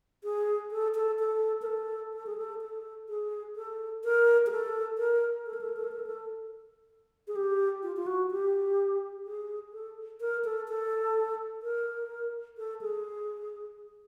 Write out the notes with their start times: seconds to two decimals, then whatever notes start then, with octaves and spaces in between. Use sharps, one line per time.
0.24 G#4
0.71 A4
0.95 A4
1.19 A4
1.62 A#4
1.66 A4
2.14 A4
2.27 G#4
2.38 A4
2.61 A4
3.09 G#4
3.56 A4
4.04 A#4
4.47 G#4
4.51 A4
4.98 A#4
5.46 A4
5.53 A#4
5.61 A4
5.69 A#4
5.76 A4
5.84 A#4
5.92 A4
5.99 A#4
6.06 A4
7.28 G#4
7.36 G4
7.83 F4
7.96 F4
8.07 F#4
8.31 G4
9.25 G#4
9.73 A4
10.21 A#4
10.45 A4
10.68 A4
11.63 A#4
12.58 A4
12.82 G#4